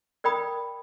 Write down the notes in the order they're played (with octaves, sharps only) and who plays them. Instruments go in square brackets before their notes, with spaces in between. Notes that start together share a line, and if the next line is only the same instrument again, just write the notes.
[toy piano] A#4 D5 G5 B5 D#6